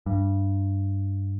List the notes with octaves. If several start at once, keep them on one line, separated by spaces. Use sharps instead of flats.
G2